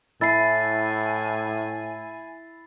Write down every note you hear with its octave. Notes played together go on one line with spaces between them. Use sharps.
A2 E4 G#5 A6 C7